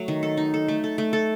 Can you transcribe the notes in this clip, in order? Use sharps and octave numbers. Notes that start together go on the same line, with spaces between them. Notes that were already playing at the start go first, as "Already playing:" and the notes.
Already playing: F#3 A3
D#3
A4
D#4
A4
A3
A4
A3
A4